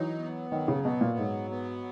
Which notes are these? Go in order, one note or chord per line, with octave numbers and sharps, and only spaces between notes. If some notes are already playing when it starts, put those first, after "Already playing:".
Already playing: E3 F#3 D#4
B3
D#3 F#3
C#3
B2 B3
A#2
G#2 F#3
B3